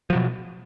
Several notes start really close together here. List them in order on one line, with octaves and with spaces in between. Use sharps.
F3 F#3 B2